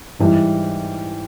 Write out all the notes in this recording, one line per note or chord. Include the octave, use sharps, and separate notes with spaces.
G#2 E3 G3